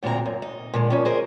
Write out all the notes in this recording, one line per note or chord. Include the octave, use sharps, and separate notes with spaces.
D2 A#2 G#3 C4 A#5
F#2
D#4
A#2 D3 G#3
A#2 F3 C#4 D#4
G#4 A#4 C5 D#5